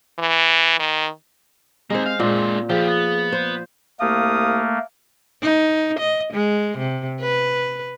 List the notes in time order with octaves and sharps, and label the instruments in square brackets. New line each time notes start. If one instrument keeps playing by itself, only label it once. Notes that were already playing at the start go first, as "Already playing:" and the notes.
[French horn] E3
D#3
[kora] G#3 C5 [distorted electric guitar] A#3 D#4 [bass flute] C4
[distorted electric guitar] F5
[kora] A#2 [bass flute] G#3 [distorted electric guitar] C4 D4
[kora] F3 [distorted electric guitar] B3 G4 [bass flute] G#4
[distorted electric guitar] B3
[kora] C5
[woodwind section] C2 F5 D#6 [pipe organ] A3 A#3
[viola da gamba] D#4
D#5
G#3
C3
B4